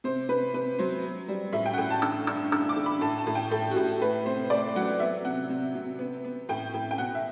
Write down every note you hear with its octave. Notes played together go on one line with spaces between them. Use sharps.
C3 C5
C3 B4
C3 B4
F#3 C5
B3
G3
A2 E5
G5
F#5
A2 G5
A5
D3 E6
G2 E6
D3 E6
D6
D3
B5
A2 A5
A5
A2
G5
A2 A4
F#4
A2 G4
A3 B4
C3 C5
A3 D5
F#3 F#5
B3 E5
C3 F#5
C3
C3
B3
B3
A2 G5
A2
G5
B2 F#5
E5